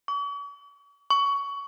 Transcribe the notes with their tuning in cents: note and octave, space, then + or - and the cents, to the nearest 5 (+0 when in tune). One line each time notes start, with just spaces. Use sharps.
C#6 +45
C#6 +20